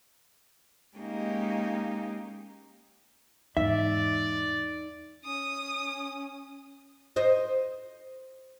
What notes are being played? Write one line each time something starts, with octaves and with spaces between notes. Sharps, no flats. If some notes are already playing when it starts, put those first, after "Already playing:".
G#3 A#3 C#4 D#4 G4
E2 G#2 D#4 D5 E5
C#4 D#6
C5 D#5